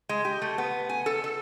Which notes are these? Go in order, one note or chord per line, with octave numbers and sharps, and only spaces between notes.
G#3
G4
A3
B3
G#5
A4
A4